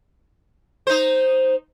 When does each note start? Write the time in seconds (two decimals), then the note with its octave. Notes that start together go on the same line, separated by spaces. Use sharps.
0.87 D#4 C5